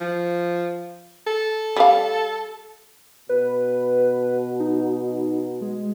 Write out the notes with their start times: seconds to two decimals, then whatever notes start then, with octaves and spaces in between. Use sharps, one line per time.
0.01 F3
1.27 A4
1.76 G3 F5
3.29 B2 B4
4.60 D#4
5.61 G#3